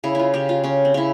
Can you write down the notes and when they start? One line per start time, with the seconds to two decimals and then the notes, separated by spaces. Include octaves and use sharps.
0.04 C#3 E4
0.15 E4 F4
0.34 C#3 G4
0.49 F4
0.64 C#3 C#4
0.85 C4
0.94 C#3 E4